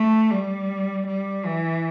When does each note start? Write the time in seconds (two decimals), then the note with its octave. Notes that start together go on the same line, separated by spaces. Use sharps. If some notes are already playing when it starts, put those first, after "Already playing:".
Already playing: A3
0.31 G3
1.07 G3
1.46 E3